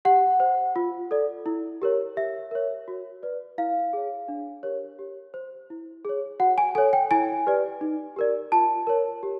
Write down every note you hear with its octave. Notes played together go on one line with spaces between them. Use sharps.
G4 F#5
C5
F4
A4 D5
E4
G4 A#4 C#5
G4 E5
A#4 C#5
F#4
B4 D5
E4 F5
G#4 C#5
D4
G4 A#4 C#5
G4
C5
E4
G#4 C#5
F#4 F#5
G#5
A4 C#5 G#5
G5
E4 G#5
G4 B4 D5
D#4
G4 A#4 D5
F4 A5
A#4 C#5
G4